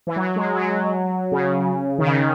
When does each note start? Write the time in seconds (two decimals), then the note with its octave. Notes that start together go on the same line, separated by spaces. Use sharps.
0.07 E3
0.16 F#3
0.36 G#3
0.55 F#3
1.32 C#3
1.98 D#3
2.07 C#3